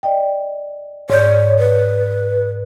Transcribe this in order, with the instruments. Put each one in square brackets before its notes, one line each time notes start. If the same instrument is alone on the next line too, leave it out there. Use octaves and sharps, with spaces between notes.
[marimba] D5 D#5 G5
[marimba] G#2 D5 G6 [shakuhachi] C#5
[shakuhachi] B4